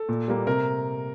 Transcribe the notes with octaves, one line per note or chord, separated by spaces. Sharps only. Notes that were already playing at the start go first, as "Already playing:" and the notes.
Already playing: A4
A#2
G3 A#3
C3 A#4